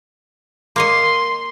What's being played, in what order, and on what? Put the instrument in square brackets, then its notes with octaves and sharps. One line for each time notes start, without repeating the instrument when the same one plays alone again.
[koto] A#3 C#5 D#5 [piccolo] C6